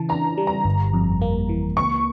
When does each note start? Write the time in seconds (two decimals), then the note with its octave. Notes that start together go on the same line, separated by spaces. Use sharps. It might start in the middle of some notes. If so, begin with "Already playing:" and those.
Already playing: C#3 E3 A5
0.09 D4 A#5
0.38 G3
0.47 A#5
0.65 G1
0.93 F2
1.22 A#3
1.49 E3
1.77 C#2 C#6